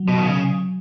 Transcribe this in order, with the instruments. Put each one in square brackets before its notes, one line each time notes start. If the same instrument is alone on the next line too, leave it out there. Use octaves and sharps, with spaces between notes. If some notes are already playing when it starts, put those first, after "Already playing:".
Already playing: [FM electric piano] F#3
[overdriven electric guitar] B2
D#3
C#3